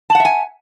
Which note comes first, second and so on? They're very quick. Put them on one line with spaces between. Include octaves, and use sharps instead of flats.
A5 F#5 E5 G#5